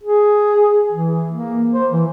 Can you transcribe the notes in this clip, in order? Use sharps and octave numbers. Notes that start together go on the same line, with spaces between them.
G#4
E3
A#3
C5
E3